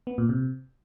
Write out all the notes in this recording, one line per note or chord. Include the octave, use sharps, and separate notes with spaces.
B3
A#2
C3